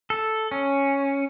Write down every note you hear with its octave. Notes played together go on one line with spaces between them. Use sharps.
A4
C#4